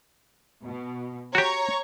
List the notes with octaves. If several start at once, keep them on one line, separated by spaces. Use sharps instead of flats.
B2
F#4 G4 C#5 A#5 C#6